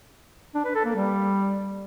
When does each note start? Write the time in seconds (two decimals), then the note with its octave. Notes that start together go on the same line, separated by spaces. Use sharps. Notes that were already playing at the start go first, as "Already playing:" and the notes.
0.54 D4
0.65 B4
0.75 A4
0.85 A#3
0.95 G3